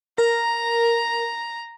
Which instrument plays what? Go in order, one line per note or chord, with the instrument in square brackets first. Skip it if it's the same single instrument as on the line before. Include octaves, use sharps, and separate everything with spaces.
[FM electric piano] A#4 [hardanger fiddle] A#5